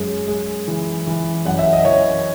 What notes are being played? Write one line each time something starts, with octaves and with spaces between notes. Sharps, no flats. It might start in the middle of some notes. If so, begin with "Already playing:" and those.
Already playing: F#2 G#3
G#3
E3
E3
F#2 F#5
E5
D#5
E3 C#5